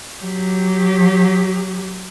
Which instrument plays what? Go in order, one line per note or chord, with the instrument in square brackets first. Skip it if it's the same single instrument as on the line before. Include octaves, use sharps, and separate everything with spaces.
[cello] F#3 G4